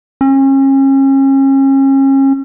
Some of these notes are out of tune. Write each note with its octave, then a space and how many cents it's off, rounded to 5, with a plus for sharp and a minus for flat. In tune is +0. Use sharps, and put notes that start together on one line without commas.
C#4 -35